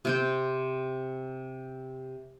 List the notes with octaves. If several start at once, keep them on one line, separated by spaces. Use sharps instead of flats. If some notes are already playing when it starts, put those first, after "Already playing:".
C3 C4 G5